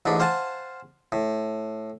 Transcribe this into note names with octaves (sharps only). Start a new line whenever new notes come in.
A1 G#2 D4 B5
C5 F5 F#5 G#5 A5
A2